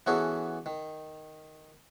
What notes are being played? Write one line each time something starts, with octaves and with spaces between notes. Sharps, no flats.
E3 B3 C#4 F#4 G#4 A4
D#3